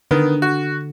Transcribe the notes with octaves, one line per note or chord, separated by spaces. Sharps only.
D3 D#3 B3
F#4